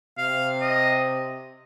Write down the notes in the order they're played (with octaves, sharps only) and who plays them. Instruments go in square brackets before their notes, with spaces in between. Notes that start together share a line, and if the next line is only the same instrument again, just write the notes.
[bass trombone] C3 [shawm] F5
[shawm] D#5